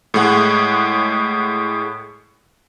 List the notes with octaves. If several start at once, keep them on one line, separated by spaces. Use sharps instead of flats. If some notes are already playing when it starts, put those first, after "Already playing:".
A2 G#3 F#5